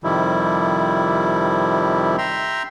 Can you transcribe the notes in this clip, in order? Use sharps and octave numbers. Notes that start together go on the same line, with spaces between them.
F2 C3 D#3 F3 G3 E4
E5 G5 A#5 C6